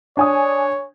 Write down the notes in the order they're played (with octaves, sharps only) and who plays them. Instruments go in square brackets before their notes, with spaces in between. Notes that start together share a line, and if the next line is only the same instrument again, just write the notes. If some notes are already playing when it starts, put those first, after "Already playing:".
[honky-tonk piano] D4 G#5 D#6 [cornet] C#5